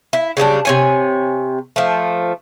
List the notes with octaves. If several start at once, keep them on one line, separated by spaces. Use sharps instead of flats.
E4
C#3 F#3 G3 D4
C3 C#5 G#5
F3 A3